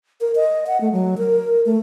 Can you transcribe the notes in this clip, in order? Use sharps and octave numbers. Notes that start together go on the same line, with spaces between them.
A#4
D#5
F#5
A3
F#3
A#4
A3